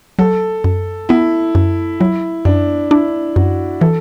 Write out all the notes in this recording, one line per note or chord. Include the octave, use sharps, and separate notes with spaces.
F#3 A4
F#2
B3 E4
F#2
F#3 E4
F#2 D4
D4 E4
F#2 F#4
E3 A4